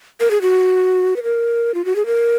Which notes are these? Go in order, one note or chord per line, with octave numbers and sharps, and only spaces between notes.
A#4
G#4
F#4
B4
A#4
F4
F#4
G#4
A#4